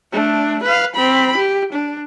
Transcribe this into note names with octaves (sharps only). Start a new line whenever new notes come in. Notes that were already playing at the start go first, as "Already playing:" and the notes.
A3 D4
B4 F5
C4 B5
G4
D4